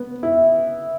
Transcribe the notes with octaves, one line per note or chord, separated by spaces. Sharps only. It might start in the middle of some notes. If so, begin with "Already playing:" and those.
Already playing: B3
E4